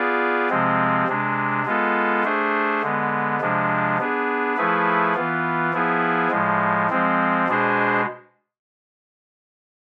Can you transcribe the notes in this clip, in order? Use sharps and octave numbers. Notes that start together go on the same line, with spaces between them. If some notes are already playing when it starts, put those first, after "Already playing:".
Already playing: B3 F4 G#4 D5
C3 F3 G#3 C4
C3 G#3 D4
G#3 B3 F4 A4
A3 D4 G#4 C5
D3 G#3 B3
C3 F3 G#3 D4
B3 D4 G#4
F3 A3 E4 G#4 B4
E3 B3 F4
F3 B3 E4 G#4
A2 F3 G#3
F3 G#3 C4
B2 G#3 D4 G#4 C5